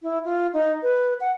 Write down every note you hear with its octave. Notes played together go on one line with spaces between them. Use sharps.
E4
F4
D#4
B4
F#5